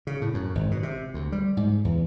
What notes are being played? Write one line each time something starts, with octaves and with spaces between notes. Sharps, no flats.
C#3
A2
F#2
G#1
B2
C3
D2
G3
G#2
E2